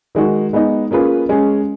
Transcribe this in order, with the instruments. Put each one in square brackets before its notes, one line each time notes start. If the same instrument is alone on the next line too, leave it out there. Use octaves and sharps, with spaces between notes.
[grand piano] D#3 G#3 D#4 F#4
G#3 B3 D#4
A#3 C#4 F4 G#4 B4
G#3 C#4 G#4